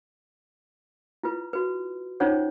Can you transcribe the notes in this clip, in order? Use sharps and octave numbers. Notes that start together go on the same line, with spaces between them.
E4 F4 B4
F#4 B4
C#4 D#4 F4 C5 C#5 F#5